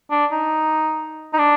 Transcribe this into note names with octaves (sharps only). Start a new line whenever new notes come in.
D4
D#4
D#4
D4